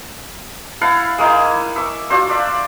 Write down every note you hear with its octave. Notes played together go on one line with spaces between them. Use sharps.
E4 F5 F#5 A5
G#3 A#3 D#4 E4
E5 C#6 D6
D4 F4 F#4 C5
D4 D5 E5